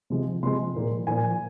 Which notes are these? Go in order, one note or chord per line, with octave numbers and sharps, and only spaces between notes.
C3 F3 G#3
C3 F3 G#3 C6
A#2 F3 A#3
A#2 F3 A#3 G#5